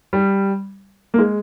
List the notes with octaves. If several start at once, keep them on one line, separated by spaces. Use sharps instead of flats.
G3
A#3
G#3